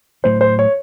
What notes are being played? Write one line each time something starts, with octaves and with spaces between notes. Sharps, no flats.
A2 F#3 A3 C5
C5
C#5